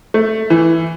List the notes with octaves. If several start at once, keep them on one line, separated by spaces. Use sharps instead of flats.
A3
E3